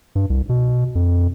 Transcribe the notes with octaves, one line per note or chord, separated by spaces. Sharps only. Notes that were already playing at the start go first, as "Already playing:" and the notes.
G2
C2
B2
F2